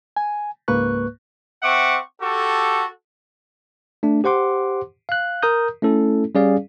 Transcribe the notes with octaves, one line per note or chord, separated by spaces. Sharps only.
G#5
C#2 G#2 A#3 B4 C#6 F#6
C4 E5 F#5 C#6 D6
F#4 G4 A4
A3 D4
G4 C5 F#5 C6 D6
F5 F#6
A#4 A#5 D#6 G6
A3 C#4 E4 A4
G3 C#4 G#4 D5 F5